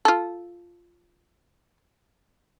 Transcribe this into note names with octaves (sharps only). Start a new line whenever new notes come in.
F4 A4